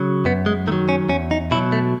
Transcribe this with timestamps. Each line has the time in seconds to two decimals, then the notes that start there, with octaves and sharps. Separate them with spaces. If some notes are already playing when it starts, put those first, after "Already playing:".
Already playing: C#3 F#3
0.25 F#2 B3
0.46 G#3
0.67 D#3 A3
0.72 F#3
0.89 C#4
1.09 E2 C#4
1.31 D#4
1.51 B2 E4
1.55 F#3
1.72 A3